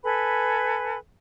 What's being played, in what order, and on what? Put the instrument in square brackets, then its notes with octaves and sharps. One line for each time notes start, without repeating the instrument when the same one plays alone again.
[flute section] A4 B4 G#5 B5